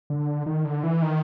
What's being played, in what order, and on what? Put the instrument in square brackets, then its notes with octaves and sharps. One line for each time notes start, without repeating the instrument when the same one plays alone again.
[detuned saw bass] D3
D#3
D3
E3
D#3